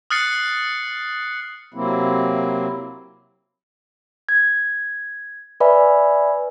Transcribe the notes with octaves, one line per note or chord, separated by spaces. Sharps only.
D#6 F6 F#6 A6 C7 C#7
C3 F#3 A#3 C4 E4
G#6
B4 D5 E5 G#5 B5